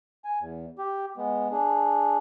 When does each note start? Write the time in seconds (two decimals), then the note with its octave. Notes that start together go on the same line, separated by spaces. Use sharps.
0.25 G#5
0.40 E2
0.78 G4
1.17 G#3 B3
1.52 D4 G#4